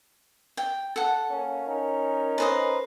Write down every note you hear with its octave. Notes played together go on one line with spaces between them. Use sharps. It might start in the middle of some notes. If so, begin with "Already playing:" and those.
G5
A4 F#5
A#3 C#4
C#4 D#4 A#4
B4 C5 D#5